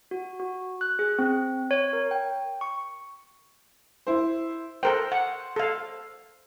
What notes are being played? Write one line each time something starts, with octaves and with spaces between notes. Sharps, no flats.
F#4
F#4
F#6
G#4
C4
C#5
A#4
G5
C#6
E4 C5
A4 A#4 C5 G5
F#5
A4 F5